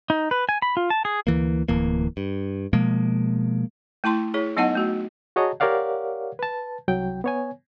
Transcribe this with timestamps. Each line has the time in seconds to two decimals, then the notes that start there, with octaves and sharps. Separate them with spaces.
0.10 D#4
0.31 B4
0.49 G#5
0.62 B5
0.77 F4
0.90 A5
1.05 G#4
1.27 D2 E3 A#3
1.68 D1 E3 A#3
2.17 G2
2.73 B2 F3 G#3 A#3
4.04 A3 E4 A5 C6
4.34 E4 G#4 C#5
4.57 F#3 B3 D#4 D#5 F#5 A5
4.75 A3 F#4
5.36 F#4 G#4 C#5 D#5 A5 A#5
5.60 G4 A#4 C#5 D5 F5 F#5
6.39 B4 A5
6.88 C2 F#3 G5
7.24 B3 C#5 G#5